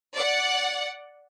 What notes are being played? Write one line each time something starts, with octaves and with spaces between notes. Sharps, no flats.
D5 F#5